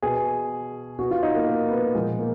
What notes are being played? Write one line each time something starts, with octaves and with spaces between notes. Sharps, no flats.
B2 G#4
B2 F#4
F4
D#4
A#3
A#3
B3
A#2 F3 G#3
A#3